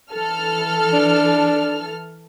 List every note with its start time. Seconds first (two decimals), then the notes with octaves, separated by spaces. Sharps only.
0.12 E3 A4 F6
0.93 D4